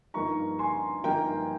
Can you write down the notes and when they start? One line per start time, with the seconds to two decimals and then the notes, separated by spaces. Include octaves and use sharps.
0.14 G2 F3 A#3 D#4 A#5 C#6
0.59 G#5 C6
1.04 G2 F3 A#3 D#4 G5 A#5